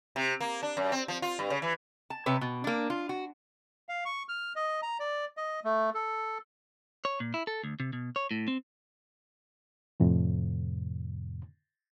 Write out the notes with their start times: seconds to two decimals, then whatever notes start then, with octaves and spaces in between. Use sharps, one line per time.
0.16 C3
0.41 A#3
0.63 D4
0.77 F#2
0.92 C4
1.08 F3
1.22 F4
1.39 G2
1.50 C#3
1.62 E3
2.10 A5
2.26 C3 B4 C#5
2.41 B2
2.64 A#3 D4
2.90 F4
3.09 F#4
3.89 F5
4.05 C#6
4.29 F6
4.56 D#5
4.82 A#5
5.00 D5
5.37 D#5
5.64 A3
5.94 A4
7.05 C#5
7.20 A#2
7.34 E4
7.47 A4
7.64 D2
7.80 C3
7.93 B2
8.16 C#5
8.31 A2
8.48 C4
10.00 F2 A2 C3